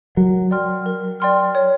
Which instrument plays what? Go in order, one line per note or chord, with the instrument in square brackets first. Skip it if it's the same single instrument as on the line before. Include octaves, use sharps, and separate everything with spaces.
[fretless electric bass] F#3 [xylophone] A#4
[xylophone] D5 G5 C6 F6
A#4
D5 G5 C6 F6
C#5